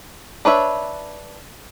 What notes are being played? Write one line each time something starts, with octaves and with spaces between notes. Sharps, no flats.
D4 B4 C#5 E5